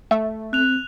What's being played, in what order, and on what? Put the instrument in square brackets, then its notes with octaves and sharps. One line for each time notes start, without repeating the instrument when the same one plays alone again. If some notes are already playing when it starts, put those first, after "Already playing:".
[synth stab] A3 [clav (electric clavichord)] E5
[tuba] C4 [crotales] F#6 F7